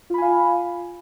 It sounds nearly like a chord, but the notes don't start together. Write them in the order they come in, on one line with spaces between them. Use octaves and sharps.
F4 B5 G#5 F5